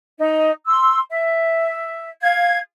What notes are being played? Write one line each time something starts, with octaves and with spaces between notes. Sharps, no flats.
D#4
C6 E6
E5
F5 G#6